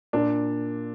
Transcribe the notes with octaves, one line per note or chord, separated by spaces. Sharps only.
A#2 D4